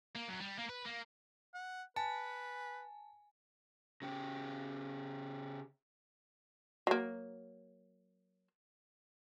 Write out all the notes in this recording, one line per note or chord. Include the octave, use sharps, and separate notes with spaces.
A#3
F#2
G3
A#3
B4
A#3
F#5
B4 G#5 A5
C#3 G4
F#3 A#3